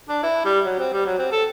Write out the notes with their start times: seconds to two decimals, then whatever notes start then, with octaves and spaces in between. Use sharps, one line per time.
0.09 D4
0.23 E4
0.45 G3
0.65 F#3
0.79 C4
0.93 G3
1.06 F#3
1.18 C4
1.32 A4